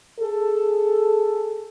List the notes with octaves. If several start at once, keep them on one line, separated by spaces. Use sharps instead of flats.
G#4 A4